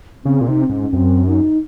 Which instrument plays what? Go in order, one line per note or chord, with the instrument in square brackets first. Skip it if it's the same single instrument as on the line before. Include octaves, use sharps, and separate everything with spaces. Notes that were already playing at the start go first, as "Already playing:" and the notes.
[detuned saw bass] C#3 [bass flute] C4
[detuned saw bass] A#2
[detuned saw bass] C3 [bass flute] D#4
[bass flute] C4
[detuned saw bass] G#2 [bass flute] C#4
[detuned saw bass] F#2 [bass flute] C4
[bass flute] D#4